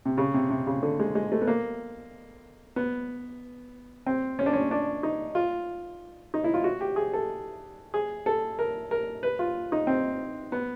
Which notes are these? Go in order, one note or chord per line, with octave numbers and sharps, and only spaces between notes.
C3
C#3
C3
C3
C#3
D3
G#3
G#3
A3
B3
A#3
B3
C4
C#4
D4
C#4
D4
D#4
F4
D#4
E4
F4
F#4
G4
G#4
A4
G#4
A4
A#4
A#4
B4
F4
D#4
C4
B3